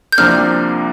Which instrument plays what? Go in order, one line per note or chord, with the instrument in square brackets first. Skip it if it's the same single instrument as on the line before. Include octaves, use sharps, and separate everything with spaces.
[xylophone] G6
[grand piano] C2 C3 F3 A#3 D4 [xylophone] F6